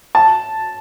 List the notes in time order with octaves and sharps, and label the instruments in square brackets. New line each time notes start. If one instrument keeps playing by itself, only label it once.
[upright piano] A5